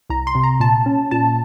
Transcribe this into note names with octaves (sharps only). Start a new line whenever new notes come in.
C2 A#5
C6
C3
A#5
A#2 A5
C#4
A#2 A5